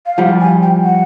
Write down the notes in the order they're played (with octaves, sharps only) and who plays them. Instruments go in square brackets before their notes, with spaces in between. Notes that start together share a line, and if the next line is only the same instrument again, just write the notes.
[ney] F5
[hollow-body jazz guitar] F3 G3 [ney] F#5
[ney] G#5
G5
F#5